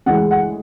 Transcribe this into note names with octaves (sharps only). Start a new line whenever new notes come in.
D2 C#3 E3 G#3 F#5
F#5